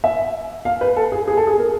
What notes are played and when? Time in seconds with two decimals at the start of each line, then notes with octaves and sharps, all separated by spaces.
0.04 E5
0.65 F5
0.81 B4
0.97 A4
1.12 G#4
1.28 G#4
1.37 A4
1.47 G#4
1.58 A#4